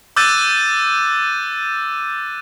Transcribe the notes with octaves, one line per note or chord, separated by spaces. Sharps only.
D6 E6 F#6 G6 A6 D#7